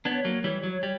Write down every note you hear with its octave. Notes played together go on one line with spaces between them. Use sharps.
B3 D4 C#5
F#3 A#3
E3 G3
F#3
G3